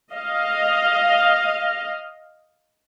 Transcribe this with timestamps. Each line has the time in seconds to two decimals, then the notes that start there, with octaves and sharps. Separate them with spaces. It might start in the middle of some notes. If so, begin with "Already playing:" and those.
0.11 D#5 F5